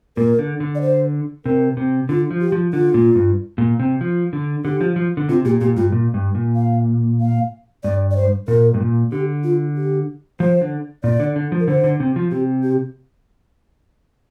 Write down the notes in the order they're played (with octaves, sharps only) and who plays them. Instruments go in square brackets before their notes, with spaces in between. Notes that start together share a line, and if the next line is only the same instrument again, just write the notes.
[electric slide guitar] A#2 [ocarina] A#4
[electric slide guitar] D3
D3
[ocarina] D5
C5
[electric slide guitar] C3 [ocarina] A#4
[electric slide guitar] C3
[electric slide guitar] D3 [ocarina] F4
[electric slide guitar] F3
[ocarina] G4
[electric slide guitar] F3
[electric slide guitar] D3 [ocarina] F4
[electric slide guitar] A#2
G2
A#2
C3
F3
D3
[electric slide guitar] D3 [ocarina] G4
[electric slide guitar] F3
F3
D3
[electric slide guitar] C3 [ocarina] F4
[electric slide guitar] A#2 [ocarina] G4
[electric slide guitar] A#2 [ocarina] G4
[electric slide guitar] G2 [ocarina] F4
[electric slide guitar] A#2
G2
A#2
[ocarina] F5
F5
[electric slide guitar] G2 [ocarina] D5
[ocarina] D5
C5
[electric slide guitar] A#2 [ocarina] A#4
[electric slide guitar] G2
A#2
[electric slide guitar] D3 [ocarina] G4
[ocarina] F4
G4
[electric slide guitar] F3 [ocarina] C5
[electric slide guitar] D3
[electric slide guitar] A#2 [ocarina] D5
[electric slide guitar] D3
D3
F3
[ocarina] A#4
[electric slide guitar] D3 [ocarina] C5
[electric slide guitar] D3
C3
F3
[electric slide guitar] C3 [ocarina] G4
[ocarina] G4